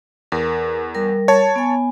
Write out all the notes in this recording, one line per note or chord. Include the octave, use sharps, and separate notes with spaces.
E2 A#4
G3 A#4
C#5 A5
B3 G#5